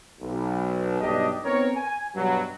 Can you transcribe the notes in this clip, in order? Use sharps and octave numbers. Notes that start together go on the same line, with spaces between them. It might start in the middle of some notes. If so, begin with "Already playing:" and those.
B1
B1 G2 D4 G4 D#5
B3 C4 D#4 A#4 C#5
G#5
G2 B2 F#3